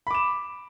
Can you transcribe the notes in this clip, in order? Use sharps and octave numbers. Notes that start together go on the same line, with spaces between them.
B5 D6 E7